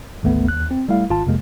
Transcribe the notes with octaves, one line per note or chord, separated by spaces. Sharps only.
G#1 D2 A3 B3
D#2 F#6
C4
G3 A3 E4 F5
G#1 F4 A5
F2 C3 G#3 A#3